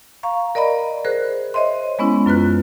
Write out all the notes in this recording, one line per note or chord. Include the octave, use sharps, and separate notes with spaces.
F5 A#5 C#6
A#4 D5 D#5 A#5 B5
G#4 A#4 C5 F#6
C5 C#5 D#5 E5 C6
G#3 B3 C#4 E4
F#2 F4 B4 F#6